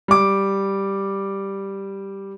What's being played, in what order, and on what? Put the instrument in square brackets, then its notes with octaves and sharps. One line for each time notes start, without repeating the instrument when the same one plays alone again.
[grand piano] G3 D6